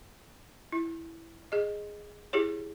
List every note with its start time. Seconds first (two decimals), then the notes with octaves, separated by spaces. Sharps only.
0.72 E4
1.52 G#4 D#5
2.33 E4 G4 G#4 C#5